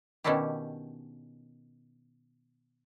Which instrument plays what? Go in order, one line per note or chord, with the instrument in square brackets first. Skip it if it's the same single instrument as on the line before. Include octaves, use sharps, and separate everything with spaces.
[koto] B2 D#3 C#4 D4 E4 G4